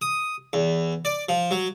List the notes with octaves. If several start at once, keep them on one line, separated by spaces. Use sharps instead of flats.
D#6
E2
D5
F3
F#3